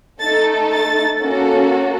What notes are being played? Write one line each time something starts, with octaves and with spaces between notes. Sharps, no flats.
A3 D#4 A4 A6
A6
A#3 C#4 F#4 A4